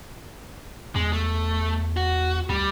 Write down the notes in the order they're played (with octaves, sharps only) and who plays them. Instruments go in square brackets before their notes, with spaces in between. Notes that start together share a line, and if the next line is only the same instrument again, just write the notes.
[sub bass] E2 [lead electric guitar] G#3
[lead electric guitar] A3
F#4
[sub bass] D2 [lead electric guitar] G3